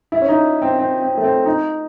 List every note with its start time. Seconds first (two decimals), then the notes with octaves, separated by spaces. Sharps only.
0.12 E4
0.22 C#4
0.29 D#4
0.62 C4
0.79 C4
1.01 C4
1.17 A3
1.24 C4
1.46 D#4